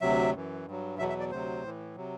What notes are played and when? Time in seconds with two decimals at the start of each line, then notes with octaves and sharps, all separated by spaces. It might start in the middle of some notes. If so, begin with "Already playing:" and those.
0.01 D2 C3 F#3 E5
0.34 F#2 E3
0.66 G2 F#3
0.98 E2 B2 F#3 E5
1.09 E5
1.20 D5
1.31 D2 C3 F#3 C5
1.64 A2 E3
1.96 C3 F#3